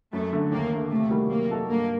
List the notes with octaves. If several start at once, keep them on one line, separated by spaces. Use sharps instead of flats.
F#2 A3
D3 A3
D#2 A#3
D3 A3
C3 A3
D#3 G3 A#3 F#4
F#3 A#3
A3 D#4 F#4 A4
G2 A#3